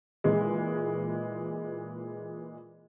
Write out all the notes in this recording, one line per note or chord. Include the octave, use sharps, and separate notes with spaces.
A#2 E3 G#3